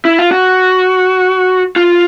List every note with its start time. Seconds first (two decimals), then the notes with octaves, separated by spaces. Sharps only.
0.05 E4
0.19 F4
0.32 F#4
1.76 F4